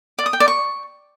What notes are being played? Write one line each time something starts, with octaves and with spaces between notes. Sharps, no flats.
D5
D#6
G5
D5
C#6